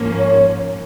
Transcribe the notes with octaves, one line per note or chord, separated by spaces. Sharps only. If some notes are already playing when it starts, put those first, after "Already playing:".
Already playing: G#2 F3 A#3 C#4
C#5